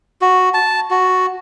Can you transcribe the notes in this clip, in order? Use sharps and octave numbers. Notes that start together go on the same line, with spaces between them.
F#4
A5
F#4